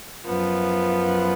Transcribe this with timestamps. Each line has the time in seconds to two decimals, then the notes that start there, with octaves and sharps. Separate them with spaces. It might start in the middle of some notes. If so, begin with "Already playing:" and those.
0.24 F#2 F3 B3